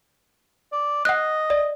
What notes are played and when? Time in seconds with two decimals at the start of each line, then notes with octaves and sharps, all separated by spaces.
0.72 D5
1.05 D#5 F#5 F#6
1.50 D5